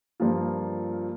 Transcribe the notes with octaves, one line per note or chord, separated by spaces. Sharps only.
G2 F3 A#3 F4